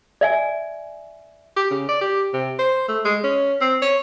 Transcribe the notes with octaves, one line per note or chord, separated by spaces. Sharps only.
D5 E5 G#5
G4
C#3
D5
G4
C3
C5
A3
G#3
C#4
C4
C#5